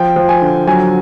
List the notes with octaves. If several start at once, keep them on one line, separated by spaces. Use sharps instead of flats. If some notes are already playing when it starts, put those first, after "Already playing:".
Already playing: F3 G5
F3
G#5
D3
F#3 G#5